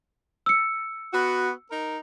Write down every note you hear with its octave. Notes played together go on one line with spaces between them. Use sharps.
E6 C#7
B3 F#4
D#4 A#4